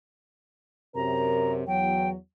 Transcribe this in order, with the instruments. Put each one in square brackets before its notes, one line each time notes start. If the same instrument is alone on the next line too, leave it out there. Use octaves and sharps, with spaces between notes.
[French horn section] F#2 C3 A#4 [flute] A#5
[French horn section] E2 F#3 [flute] G5